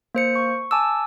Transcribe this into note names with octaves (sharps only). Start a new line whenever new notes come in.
A#3 C5 C#7
C#6
G#5 A5 D6 E6